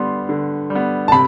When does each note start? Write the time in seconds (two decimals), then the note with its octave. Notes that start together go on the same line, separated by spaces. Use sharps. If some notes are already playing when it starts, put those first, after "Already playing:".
Already playing: D3 G3 B3 C6
0.29 D3
0.70 G3
0.75 B3
1.08 A5
1.12 C3 B5